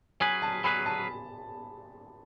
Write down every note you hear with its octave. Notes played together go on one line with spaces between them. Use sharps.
F#3 C#4 G#4 B4 G#5
A5
F#3 C#4 G#4 B4 B5
A5